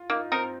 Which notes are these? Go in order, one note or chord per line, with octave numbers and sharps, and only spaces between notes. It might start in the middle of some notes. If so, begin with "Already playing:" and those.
Already playing: F4
A#3 D#4
C4 D#4 A#4